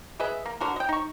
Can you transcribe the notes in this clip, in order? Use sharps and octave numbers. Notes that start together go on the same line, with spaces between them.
G#4 B4 D#5 E5
A#3
D3 F#4 A#4
D#5 G5
D#4 C#6